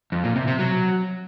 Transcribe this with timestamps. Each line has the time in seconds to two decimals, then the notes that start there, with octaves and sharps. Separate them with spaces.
0.12 F2
0.24 A#2
0.36 C3
0.48 C3
0.59 F#3